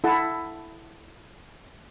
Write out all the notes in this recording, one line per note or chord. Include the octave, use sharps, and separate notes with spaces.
E4 A4 F#5 A5